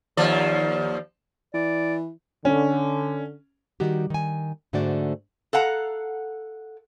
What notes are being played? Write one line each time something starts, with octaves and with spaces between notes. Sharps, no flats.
D#2 F3 D5
E3 D5
D3 C#4
D#3 G3 F#4 G4
D#3 G#5
G#2 D3 A3 F#4 C5 D5
A4 F5 F#5 A#5